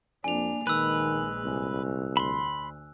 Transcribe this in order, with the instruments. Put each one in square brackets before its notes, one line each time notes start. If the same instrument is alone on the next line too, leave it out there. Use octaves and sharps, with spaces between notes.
[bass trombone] F2 [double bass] A#3 D4 [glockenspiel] G#5 F7
[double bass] A#1 G#3 [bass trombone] D#3 [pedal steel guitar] B4 [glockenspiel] E6 F#6
[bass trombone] C2
[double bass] D2 [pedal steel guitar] B5 C6